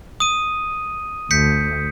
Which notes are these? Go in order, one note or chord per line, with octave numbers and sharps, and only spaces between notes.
D#6 D#7
D2 G6 B6 C#7